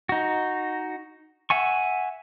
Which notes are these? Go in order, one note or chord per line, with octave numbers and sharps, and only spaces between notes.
D#4 F#4
E5 F#5 G#5 C#6